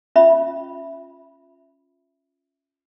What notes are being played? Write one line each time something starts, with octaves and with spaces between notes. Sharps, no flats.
C#4 F4 E5 B5